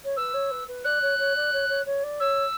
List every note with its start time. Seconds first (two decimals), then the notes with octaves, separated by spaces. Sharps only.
0.04 C#5
0.17 B4 E6
0.34 C#5
0.51 B4
0.68 B4
0.84 D5 F#6
1.02 C#5
1.18 C#5
1.36 D5
1.53 C#5
1.69 C#5
1.86 C#5
2.04 D5
2.20 C#5 E6